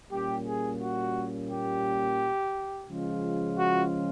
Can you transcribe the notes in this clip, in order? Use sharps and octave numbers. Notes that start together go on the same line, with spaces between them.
A#2 G3 A#3 C#4 G4
G#4
F#4
G4
C#3 F3 G#3 C#4 F4
F#4